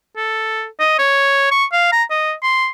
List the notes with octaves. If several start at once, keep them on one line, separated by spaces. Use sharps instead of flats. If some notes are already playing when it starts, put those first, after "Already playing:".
A4
D#5
C#5
C#6
F5
A#5
D#5
C6